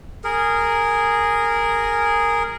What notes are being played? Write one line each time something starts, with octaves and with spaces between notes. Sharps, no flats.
G#4 A#4